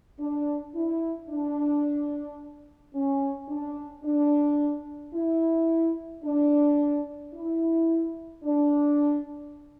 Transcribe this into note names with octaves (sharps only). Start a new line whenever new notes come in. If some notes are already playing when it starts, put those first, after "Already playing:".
D4
E4
D4
C#4
D4
D4
E4
D4
E4
D4